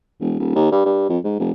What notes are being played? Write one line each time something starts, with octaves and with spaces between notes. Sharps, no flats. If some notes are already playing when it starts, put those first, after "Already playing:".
E1
D#1
D#2
G2
G2
F2
G#2
F1